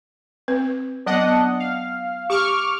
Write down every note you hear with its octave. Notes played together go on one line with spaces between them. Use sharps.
C4 B4
F#3 B3 D4 D#5 F#5
F5
G4 C#6 D6 F6